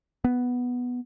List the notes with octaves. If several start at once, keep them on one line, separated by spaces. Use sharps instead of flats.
B3